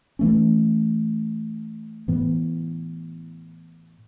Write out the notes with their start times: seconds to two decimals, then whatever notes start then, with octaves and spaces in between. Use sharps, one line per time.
0.19 E3 A3 C#4
2.08 A2 E3 B3